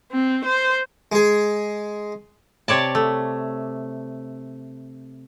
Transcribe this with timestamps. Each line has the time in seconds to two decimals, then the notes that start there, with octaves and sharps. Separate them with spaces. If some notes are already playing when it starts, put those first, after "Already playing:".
0.12 C4
0.45 C5
1.12 G#3 G#4
2.68 C3 C#5 D5 A5
2.95 A3